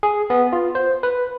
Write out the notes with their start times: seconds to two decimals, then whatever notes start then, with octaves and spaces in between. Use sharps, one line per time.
0.03 G#4
0.30 B3
0.53 F4
0.75 C5
1.03 B4